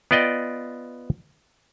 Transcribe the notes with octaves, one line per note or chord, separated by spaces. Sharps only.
B3 F4 D5 D#5 G5